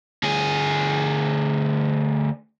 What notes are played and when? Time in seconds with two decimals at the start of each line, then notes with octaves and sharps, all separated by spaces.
0.24 D2 G#4